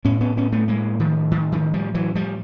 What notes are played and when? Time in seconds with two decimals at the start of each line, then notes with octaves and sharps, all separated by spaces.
0.05 A2 B3 C#4
0.21 B3 C#4
0.37 B3 C#4
0.52 A3 B3
0.68 G#3 A#3
1.00 D#3 F3
1.31 D#3
1.52 D#3 F3
1.74 F3 G3
1.94 E3 F#3
2.15 F3 G3